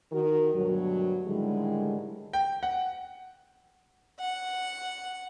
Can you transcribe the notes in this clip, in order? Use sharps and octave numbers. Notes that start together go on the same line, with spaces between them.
D#3 F#4 A#4
D2 G2 B2 F#3
A2 D3 D#3 G3 G#3
G5
F#5
F#5